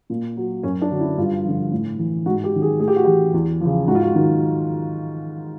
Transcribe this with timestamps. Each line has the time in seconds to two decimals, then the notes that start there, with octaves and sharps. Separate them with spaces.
0.10 A#2
0.37 F#3
0.63 F#2 C#4
0.82 D4
0.91 D3 F#3
1.00 E4
1.18 G2 F4
1.45 D3 F3
1.72 A2
1.99 E3
2.26 G#2 F#4
2.44 G4
2.53 D#3 F#3
2.62 G#4
2.80 A2 G#4
2.88 G4
2.96 F#4
3.04 E3 G4
3.34 E2
3.61 C#3 F3
3.88 G#2 F#4
3.95 F4
4.02 F#4
4.15 D#3 F#3